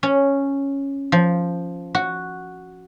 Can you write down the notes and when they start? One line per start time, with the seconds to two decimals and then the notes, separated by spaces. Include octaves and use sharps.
0.03 C#4
1.12 F3
1.95 F#4